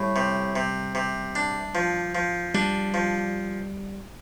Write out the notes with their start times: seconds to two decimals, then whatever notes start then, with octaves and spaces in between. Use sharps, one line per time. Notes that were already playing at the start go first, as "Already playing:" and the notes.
Already playing: A2 G3
0.16 C3
0.56 C3
0.95 C3
1.35 D4
1.75 F3
2.15 F3
2.54 G3 D4
2.94 F3